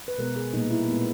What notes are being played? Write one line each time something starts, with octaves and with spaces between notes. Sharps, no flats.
B4
B2 G#3 B3 A#4
G#4
A#2 G3 A#3 D#4
E4
A#2 G#3 B3